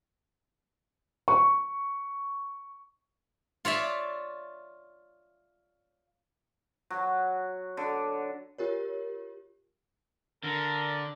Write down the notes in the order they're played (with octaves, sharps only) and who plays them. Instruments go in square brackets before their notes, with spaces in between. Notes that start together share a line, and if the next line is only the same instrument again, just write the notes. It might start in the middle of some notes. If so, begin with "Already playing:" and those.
[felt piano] C#6
[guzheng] F4 C#5 D5 E5
[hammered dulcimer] F#3
D3
[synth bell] F4 G4 A#4 C#5
[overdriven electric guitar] D3 [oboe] A#4